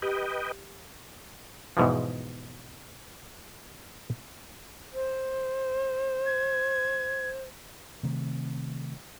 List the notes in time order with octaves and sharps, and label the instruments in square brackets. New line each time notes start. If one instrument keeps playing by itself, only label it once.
[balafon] G4 [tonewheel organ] B4 D#5 G5
[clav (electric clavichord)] E2 G#2 B2 E3 F3
[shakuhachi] C5
[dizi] G#6
[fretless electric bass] C3 D#3 A3 C4